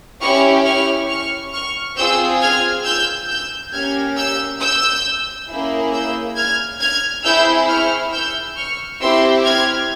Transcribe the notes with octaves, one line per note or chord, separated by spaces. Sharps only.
C#4 E4 G4 C#6 F6
C#6 F6
C#6 F6
C#6 F6
C4 F4 G#4 E6 G6
F6 G#6
E6 G6
E6 G6
A#3 C#4 G4 F6 G#6
E6 G6
E6 G6
A#3 C#4 E4 G#4
E6 G6
F6 G#6
F6 G#6
C4 E4 G#4 E6 G6
C#6 F6
E6 G6
C#6 F6
C4 E4 G4 C6 E6
F6 G#6